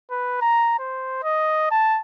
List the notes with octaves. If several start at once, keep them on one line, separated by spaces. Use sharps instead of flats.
B4
A#5
C5
D#5
A5